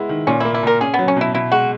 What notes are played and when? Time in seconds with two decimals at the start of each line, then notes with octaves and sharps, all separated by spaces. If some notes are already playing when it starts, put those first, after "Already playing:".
Already playing: G#3 B3 E4
0.09 D#3
0.27 A#2 C#4
0.40 A#3 E4
0.54 E4
0.63 A#2 A#4
0.81 C#4 G#4
0.94 F#3 B3
1.08 C#4
1.16 B2 E4
1.34 B2 E4
1.52 G#3 F#4